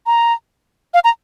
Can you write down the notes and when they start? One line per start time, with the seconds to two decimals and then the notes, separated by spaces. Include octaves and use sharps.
0.07 A#5
0.94 F5
1.04 A#5